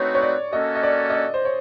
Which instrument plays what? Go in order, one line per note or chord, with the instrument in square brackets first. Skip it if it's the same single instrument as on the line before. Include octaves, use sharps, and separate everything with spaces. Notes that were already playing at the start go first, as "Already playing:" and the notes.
Already playing: [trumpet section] A3 C4 D#4 F#4 B4 [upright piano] C#5
[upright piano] C#5
D5
[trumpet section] A#3 C#4 F#4 A4 [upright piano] D#5
[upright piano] D#5
D5
D#5
D5
C5
C#5